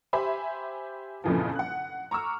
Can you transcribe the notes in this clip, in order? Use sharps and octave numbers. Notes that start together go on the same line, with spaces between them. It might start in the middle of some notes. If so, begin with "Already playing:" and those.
G4 C5 E5 G#5 B5
G1 F2 A#2 C#3 E3 F3
F#5 F#6
A#5 C#6 D6 E6 F6